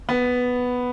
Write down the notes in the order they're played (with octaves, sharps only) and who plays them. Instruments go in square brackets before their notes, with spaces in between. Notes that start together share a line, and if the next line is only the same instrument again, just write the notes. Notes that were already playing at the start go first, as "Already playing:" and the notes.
[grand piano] B3